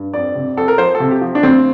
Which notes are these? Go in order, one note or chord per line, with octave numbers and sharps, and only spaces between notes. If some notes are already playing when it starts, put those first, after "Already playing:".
Already playing: G2
F2 D5
C3
F2 A4
A#4
F3 C5
A4
C3
G4
F3
D4
D2 C4